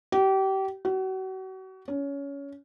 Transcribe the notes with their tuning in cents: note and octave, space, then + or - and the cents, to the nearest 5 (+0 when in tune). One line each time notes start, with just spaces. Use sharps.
G4 -30
F#4 +35
C#4 +20